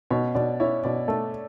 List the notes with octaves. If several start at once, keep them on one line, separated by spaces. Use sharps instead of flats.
B2 C#4 C#5
B2 D4 D5
C#4 E4 C#5
B2 D4 D5
A3